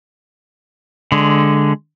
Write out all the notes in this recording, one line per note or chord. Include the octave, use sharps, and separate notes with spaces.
D3 G#3